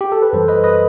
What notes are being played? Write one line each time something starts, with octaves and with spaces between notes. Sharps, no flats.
G4
A4
B4
F#2 E3 G3 A4 C5
B4 D#5
B4 D#5